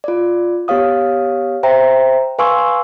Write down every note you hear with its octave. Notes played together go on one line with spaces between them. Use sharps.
F4 D5
B3 G4 C#5 F5 D#6
C5 E5 G5 A#5
B4 F5 G#5 C6 C#6 E6